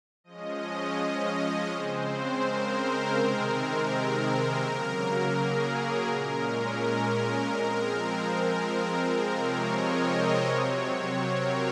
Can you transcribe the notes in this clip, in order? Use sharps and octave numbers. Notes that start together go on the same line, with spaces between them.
F3 G#3 C#4 D#5
C#3 G#3 C4 C5
A#4
C3 D#3 G#3 C4 A#4
C#3 F#3 A#3
G#4
G#4
A#2 G#3 C#4 A#4
A#4
F3 G#3 C4
A#4
C3 F3 G#3 C4 A#4
C#5
D#5
C3 F#3 C4 C#5
A#4